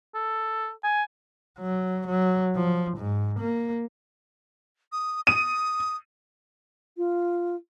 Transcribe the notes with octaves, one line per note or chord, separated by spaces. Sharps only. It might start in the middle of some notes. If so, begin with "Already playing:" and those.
A4
G#5
F#3
F#3
F3
G#2
A#3
D#6
D#6 D#7
F4